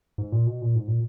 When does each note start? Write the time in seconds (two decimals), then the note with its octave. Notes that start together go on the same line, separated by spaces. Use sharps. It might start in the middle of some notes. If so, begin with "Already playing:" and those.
0.18 G#2
0.32 A#2
0.46 B2
0.62 A#2
0.76 G#2
0.88 A#2